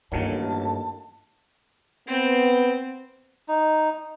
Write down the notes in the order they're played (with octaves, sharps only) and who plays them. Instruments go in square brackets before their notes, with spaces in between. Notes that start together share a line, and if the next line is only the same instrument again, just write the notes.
[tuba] A1 [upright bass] G2 D4 [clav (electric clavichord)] A#2 D#3 F#3 [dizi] A5
[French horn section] B3 [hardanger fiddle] C4
[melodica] D#4